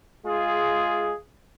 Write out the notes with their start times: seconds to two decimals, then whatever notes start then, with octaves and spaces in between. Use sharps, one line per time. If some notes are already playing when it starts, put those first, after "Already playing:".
0.25 G#3 F4 G#4